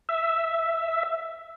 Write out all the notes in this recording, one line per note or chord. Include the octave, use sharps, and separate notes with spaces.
E5